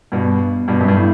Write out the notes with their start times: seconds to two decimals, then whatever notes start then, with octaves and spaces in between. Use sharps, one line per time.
0.12 G2 B2
0.68 G2 B2
0.81 F#2
0.88 G2
0.96 A2